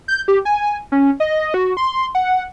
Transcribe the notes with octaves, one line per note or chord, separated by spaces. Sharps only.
G6
G4
G#5
C#4
D#5
F#4
C6
F#5